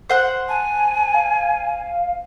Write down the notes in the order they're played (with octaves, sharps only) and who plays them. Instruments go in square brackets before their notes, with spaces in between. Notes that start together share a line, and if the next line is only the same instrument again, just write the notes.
[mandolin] C5 F#5 F#6
[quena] G#5 [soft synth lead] A5
[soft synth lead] F5